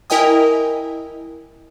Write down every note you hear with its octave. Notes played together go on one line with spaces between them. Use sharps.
E4 A#4 D#5 G5 G#5 D#6